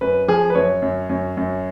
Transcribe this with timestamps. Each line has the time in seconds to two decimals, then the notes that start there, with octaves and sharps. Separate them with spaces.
0.01 F#2 B4
0.28 F3 G#4
0.50 B4
0.55 F#2 C#5
0.82 F#2
1.09 F#2
1.37 F#2